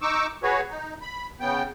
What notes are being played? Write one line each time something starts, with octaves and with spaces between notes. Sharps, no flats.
D#4 C#6 D6 E6
F#4 G#4 B4 C#5
D#4
B5
C#3 B3 G5